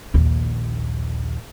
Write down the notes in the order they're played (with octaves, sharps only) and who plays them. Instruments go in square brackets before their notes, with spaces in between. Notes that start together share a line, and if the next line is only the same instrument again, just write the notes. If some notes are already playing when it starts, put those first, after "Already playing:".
[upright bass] A#1 D#2